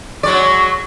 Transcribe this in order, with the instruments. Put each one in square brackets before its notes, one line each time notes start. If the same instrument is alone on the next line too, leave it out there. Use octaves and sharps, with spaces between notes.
[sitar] F#3 G#3 D5 [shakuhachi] C#6